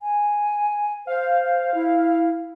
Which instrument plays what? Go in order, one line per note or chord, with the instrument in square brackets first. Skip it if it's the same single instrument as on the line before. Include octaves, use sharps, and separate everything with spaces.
[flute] G#5
[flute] C5 [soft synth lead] F5
[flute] E4